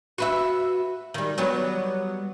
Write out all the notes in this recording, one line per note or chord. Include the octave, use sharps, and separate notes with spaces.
F#4 B4 E5
D#3 G3
F#3 G3 B3